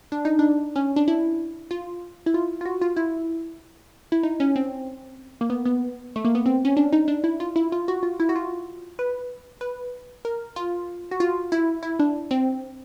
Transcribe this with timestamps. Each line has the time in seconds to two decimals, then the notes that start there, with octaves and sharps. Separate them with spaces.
0.12 D4
0.25 D#4
0.39 D4
0.76 C#4
0.96 D4
1.08 E4
1.71 F4
2.26 E4
2.34 F4
2.61 F4
2.65 F#4
2.81 F4
2.96 E4
4.12 E4
4.23 D#4
4.40 C#4
4.56 C4
5.41 A#3
5.50 B3
5.66 B3
6.16 A3
6.25 A#3
6.35 B3
6.46 C4
6.65 C#4
6.77 D4
6.93 D#4
7.08 D4
7.24 E4
7.40 F4
7.56 E4
7.72 F4
7.88 F#4
8.03 F4
8.20 E4
8.29 F#4
8.36 F4
8.99 B4
9.61 B4
10.25 A#4
10.56 F4
11.11 F#4
11.20 F4
11.52 E4
11.83 E4
11.99 D4
12.31 C4